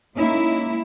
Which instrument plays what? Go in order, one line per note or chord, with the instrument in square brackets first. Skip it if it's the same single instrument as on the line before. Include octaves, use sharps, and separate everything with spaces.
[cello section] G#3 A#3 E4 [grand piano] C#4 D#4